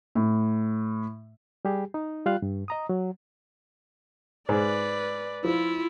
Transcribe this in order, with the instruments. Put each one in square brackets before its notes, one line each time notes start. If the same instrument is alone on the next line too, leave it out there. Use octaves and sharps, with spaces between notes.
[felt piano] A2
[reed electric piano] G3 G4 G#4
D#4
G3 F4 F5 F#6
G2
D#5 A#5 D#6
F#3
[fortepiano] G#2 [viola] B4 D5
[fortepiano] F3 [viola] E4 F4